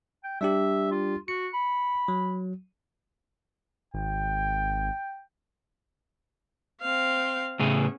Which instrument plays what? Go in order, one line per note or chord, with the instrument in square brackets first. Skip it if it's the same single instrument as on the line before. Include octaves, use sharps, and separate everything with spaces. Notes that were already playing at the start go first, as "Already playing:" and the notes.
[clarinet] G5
[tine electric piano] G3 D4 G4 [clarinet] E5
[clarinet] F4
[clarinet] F#4 [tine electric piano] C#7
[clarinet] B5
[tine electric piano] F#3
[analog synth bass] G#1 [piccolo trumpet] G5
[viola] C4 F5
[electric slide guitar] A2 C#3 G#4 [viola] B3 C#4